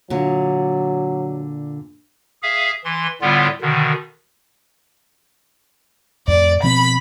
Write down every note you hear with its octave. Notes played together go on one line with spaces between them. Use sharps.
A#2 D3 F#3
G#4 E5 F5
E3 C6
A2 D3 G3 B3 F4
B2 D3 D#3
F2 A2 D5
B2 F3 C4 B5